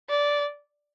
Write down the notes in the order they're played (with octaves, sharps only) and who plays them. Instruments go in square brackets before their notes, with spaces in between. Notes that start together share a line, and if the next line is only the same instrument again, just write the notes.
[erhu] D5